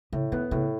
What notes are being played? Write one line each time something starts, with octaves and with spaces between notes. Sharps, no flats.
A2 C#3
D#3 B3
A2 C#3